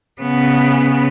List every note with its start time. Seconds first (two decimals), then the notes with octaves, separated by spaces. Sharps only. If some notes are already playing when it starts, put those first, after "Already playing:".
0.22 C#3 B3